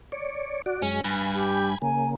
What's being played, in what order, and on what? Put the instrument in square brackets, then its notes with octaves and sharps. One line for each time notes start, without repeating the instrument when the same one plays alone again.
[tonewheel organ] C#5 D5
F#4 D5
[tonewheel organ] F#2 G#3 [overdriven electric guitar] C#4
[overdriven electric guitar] G2 [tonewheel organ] G#5 B5
[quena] G4
[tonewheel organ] C#3 A#3 [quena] G#5